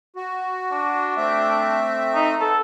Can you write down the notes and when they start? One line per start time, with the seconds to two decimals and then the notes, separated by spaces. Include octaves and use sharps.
0.16 F#4
0.72 D4
1.17 A3 C4 E5
2.15 D#4
2.41 B3 A4